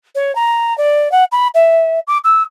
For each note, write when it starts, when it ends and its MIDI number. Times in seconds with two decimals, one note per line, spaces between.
0.15 0.34 73
0.35 0.76 82
0.77 1.11 74
1.11 1.24 78
1.31 1.47 83
1.54 1.99 76
2.07 2.18 86
2.24 2.42 88